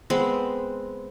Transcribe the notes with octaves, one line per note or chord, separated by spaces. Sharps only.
G#3 B3 C4 B4